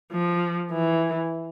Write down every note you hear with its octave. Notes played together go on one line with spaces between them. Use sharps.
F3
E3